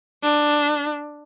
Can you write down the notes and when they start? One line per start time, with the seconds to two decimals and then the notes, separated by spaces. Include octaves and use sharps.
0.23 D4